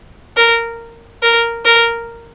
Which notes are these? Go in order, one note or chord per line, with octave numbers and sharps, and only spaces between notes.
A#4
A#4
A#4